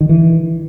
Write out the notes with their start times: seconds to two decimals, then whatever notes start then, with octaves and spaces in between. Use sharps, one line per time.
0.01 D#3
0.09 E3